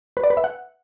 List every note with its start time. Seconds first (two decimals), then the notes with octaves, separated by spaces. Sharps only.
0.17 B4
0.24 D5
0.30 B4
0.37 E5
0.44 F#5